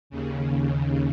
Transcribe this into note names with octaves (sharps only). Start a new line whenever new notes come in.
D#2 C#3